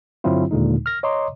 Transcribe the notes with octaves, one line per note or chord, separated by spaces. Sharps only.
G2 D3 F#3 C4 E4 F4
D#2 A#2 D3 G#3 D#4
F6 A#6
C#5 D#5 A#5 C6 D6